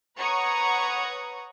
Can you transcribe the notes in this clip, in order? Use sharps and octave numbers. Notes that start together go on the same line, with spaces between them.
B4 C#5 F#5 A#5 C#6 D#6